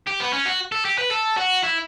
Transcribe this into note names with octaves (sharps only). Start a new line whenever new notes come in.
G4
B3
C#4
F#4
A4
G4
B4
A4
F#4
E4